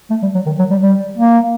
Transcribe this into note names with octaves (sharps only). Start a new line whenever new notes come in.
A3
G3
F#3
D#3
F#3
G3
G3
A#3